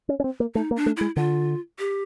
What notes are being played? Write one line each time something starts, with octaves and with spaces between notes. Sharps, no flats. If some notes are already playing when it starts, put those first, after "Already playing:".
C#4
C#4
C4
A#3
A3 D#4
A#3
D4
A3
G#3 E4
D3 F4
G4